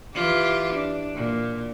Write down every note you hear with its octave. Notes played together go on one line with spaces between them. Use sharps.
E3 F4 G4
D4
A#2